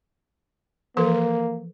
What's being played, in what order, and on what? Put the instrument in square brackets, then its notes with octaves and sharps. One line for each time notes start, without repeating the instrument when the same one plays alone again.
[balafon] E3 F3 A4 [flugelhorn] A#3